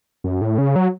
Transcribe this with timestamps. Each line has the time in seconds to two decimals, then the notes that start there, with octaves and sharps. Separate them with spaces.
0.24 F#2
0.42 A2
0.58 C#3
0.76 F#3